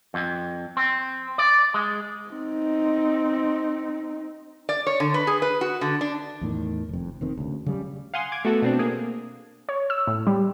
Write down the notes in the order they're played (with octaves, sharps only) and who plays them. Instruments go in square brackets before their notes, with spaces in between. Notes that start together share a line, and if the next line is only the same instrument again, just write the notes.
[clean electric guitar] F2
C4
D5
G#3
[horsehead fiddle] C4 D#4
[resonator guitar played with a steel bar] D5
C#5
D3
B4
G#4
B4
F#4
D3
D4
[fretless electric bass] E2 A2 D#3
F1 F2
F1 D#3 C4
D2 C#3
C#3 F#3 G3
[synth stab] F5 F#5 G#5 C6 D#6
D6 G#6
A3 B3 F#4 A4
B2 C4 D4
A#3 G#4
[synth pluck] C#5
E6
A2
G3